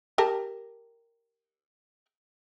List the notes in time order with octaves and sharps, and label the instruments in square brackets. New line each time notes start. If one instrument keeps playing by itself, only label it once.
[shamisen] G4 A#4 A5